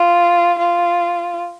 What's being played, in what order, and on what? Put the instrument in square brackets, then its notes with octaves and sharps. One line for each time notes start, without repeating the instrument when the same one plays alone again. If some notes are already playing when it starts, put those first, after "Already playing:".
Already playing: [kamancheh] F4
F4